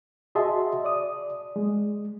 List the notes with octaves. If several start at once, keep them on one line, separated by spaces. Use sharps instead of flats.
F#4 G#4 D#5 E5 A5 C6
D5 D#6
G#3